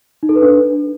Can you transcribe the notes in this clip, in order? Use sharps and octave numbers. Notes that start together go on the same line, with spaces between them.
D#4
A4
B4
D4